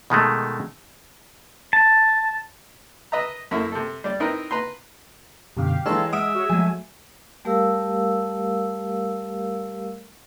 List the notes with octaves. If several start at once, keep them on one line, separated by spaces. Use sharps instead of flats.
B2 D#3 G#3 A3
A5
B4 D#5 E5 A#5
F#2 A3 A#3 E4
C3 A4
G3 D5
C4 D#4 E4 A#4 B4
B4 A#5 C6
F#2 B2 D3 G4 F5
E3 G#3 A4 C#5 A#5 C6
G#3 E5 F#5 D#6 F6 D7
F#4 G#4 C#5
F3 F#3 G#3 A3 G#5
G3 A3 G4 A#4 F5 E6